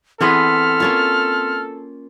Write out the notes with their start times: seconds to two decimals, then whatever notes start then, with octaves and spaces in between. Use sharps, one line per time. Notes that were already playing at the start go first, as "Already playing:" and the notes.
0.21 E3 B3 C4 G#4 A4 C6 F6 B6
0.80 A#3 C#4 F4